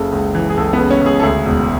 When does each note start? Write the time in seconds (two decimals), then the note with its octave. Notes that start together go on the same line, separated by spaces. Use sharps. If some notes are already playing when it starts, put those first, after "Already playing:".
Already playing: F#1 C#3 A4
0.12 C#2
0.35 E3
0.50 G#4
0.57 C#2 A4
0.73 B3
0.79 C#3
0.91 C#4
1.01 C#2
1.06 G#4
1.20 A4
1.23 D2 G#4
1.46 E1